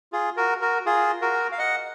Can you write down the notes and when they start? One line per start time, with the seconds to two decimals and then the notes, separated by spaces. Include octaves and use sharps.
0.12 F4 G#4
0.37 F#4 A#4
0.61 F#4 A#4
0.86 F4 G#4
1.22 F#4 A#4
1.52 F5
1.58 D#5 F#5